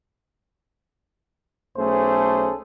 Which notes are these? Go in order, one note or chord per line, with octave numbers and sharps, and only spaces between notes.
B1 A3 C#4 G#4 A4 C5